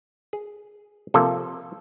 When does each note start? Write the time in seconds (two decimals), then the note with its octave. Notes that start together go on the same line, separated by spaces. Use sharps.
0.33 G#4
1.14 C3 F3 A#3 A4